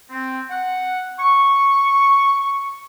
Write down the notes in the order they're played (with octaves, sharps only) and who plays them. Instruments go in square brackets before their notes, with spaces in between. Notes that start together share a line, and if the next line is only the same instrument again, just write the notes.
[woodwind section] C4
F#5
C#6